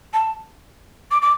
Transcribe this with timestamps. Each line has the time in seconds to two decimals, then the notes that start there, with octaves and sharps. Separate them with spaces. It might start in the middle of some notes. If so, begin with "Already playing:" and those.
0.13 A5
1.11 D6
1.21 D6